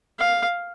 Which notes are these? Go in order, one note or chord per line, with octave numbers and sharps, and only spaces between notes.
F5